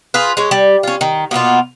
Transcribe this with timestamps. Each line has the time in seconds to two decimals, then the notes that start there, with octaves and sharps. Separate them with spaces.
0.14 F4 G#4 B4
0.37 G#3 C#4
0.51 G3
0.83 C#4 F4
1.01 D#3
1.31 B2 A#3 B3 F4